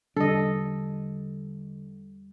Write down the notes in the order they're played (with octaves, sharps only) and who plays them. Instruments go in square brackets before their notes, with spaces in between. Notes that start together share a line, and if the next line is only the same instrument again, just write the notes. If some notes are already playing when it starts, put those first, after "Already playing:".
[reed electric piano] E2 G3 [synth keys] D3 [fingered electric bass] D4 [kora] A4 D#5